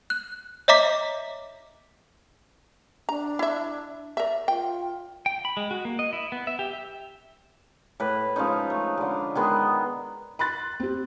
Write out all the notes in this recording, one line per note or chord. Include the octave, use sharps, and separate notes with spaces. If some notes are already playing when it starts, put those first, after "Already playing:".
F#6
C#5 D#5 E5 A#5 D6 B6
D4 A#5
E4 E5
A#4 D5 E5
F4 G5
G5
B5
G#3
F#4
A#3
D#5
E4
B3
E5
G4
E5
A2 B4
F3 G#3 C#4 D#4
A3
D3 G#3
D#3 G#3 B3
B5 C6 F#6 A6
C4 G4